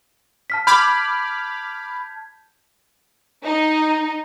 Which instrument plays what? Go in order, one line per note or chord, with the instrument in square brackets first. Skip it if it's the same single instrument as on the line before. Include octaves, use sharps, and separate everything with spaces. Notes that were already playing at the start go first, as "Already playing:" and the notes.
[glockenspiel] A5 F6 B6
[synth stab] B5 D6 F6 [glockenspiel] G6 G#6 B6
[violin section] D#4